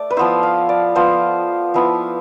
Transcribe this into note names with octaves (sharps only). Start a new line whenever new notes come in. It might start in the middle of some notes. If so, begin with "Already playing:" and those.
Already playing: A3 D5
B4
F3 B3 E4 C5
F5
D5
F3 B3 F4 C5
F3 B3 E4